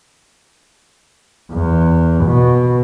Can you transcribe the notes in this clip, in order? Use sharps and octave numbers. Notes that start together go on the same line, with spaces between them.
E2
B2